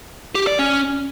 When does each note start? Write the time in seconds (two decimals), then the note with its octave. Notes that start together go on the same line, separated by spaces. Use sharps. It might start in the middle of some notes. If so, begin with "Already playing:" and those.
0.35 G4
0.47 D5
0.59 C#4